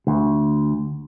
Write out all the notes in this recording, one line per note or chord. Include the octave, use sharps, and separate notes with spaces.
D2